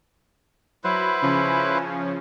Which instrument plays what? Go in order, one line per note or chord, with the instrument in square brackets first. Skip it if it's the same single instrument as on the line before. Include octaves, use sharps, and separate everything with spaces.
[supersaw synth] F#3 [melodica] E4 B4 C5
[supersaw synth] C#3 F3 C#4